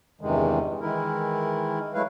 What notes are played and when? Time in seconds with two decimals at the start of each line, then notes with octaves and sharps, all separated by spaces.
0.21 E2 G2 C3 D#3 E3 G#3
0.81 D#3 E3 G#3 E4 A#4
1.94 F#3 G#3 A3 E4 B4 F5